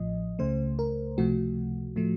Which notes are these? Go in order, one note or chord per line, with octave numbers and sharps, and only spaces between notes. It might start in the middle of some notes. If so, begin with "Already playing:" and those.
Already playing: A1 A2 F3 D#5
C#2 C#3 A3 C5
A#4
C#2 C3 F3 A3 F#4
A2 F3 A3